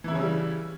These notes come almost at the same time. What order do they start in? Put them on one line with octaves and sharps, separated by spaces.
E3 E4 C#3 C#4 G3